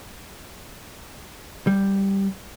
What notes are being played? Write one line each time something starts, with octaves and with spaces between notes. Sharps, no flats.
G3